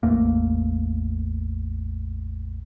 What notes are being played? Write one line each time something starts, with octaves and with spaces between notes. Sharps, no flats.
A1 E2 A3 A#3